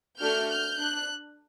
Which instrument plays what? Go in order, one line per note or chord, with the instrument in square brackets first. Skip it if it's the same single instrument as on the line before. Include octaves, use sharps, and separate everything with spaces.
[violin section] A3 D4 F#4 A4 F6 G6
F6 G6
D4 F#6